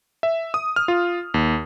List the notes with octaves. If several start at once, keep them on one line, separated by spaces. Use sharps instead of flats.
E5
D#6
F6
F4
D#2